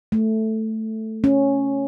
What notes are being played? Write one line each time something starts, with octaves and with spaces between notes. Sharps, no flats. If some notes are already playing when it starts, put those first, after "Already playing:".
A3
C#4